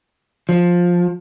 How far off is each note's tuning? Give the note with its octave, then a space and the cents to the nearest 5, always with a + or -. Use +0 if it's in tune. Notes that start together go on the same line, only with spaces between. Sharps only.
F3 +10